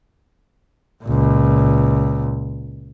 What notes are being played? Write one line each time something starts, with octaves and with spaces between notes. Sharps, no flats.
C#2 A#2